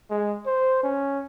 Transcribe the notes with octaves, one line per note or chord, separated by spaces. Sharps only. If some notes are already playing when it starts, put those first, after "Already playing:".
G#3
C5
C#4